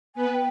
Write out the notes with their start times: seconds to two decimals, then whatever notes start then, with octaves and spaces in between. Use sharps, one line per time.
0.15 B3 B4 G#5
0.34 G5